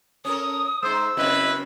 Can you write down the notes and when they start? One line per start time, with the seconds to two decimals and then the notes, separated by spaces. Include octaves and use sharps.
0.25 C#4 A4 A#4 D#6
0.83 G#3 D#4 C5 E6
1.17 F#2 C#3 C4 E4 B4 D#5